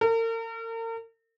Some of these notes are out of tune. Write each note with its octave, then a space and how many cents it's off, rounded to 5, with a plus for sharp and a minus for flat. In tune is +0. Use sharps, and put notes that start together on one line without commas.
A#4 -40